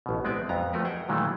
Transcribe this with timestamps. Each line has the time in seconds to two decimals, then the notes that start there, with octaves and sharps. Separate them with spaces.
0.06 A1 B2
0.25 G#3 B3 C4 B4 D5 E5
0.49 F2 B3 A#5
0.73 F3 A3 F#4 A#4 B4
0.85 G#4 E5 F#5 G5
1.09 A#2 D#3 E3 F#3 G#3 A3